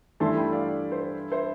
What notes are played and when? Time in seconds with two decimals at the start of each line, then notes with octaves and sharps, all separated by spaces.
0.20 G2 E3 A3 E4 A4 A5 C6
0.36 G5 B5
0.52 D5 F5
0.69 D5
0.92 C5
1.32 C5 E5